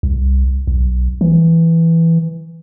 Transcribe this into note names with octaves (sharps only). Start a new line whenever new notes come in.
C2
B1
E3